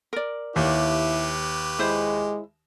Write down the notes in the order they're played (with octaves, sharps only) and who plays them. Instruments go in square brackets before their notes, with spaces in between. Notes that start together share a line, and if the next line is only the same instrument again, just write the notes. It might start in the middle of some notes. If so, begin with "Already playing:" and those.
[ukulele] A#4 D5
[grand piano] D#2 [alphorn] E4 [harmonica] G4 B4
[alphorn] G#3 [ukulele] E4 C5 E5